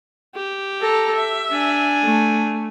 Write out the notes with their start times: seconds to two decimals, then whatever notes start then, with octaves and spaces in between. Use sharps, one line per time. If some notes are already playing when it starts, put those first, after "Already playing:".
0.35 G4
0.81 A4 A#5
1.16 E5
1.51 D4 G#5
2.03 A3